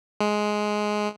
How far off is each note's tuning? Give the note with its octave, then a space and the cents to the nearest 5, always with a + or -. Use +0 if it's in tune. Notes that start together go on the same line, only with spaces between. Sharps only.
G#3 +10